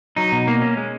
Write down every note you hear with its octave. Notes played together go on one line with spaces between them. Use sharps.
F#3 D#4
B2
A#3
C#4
G#3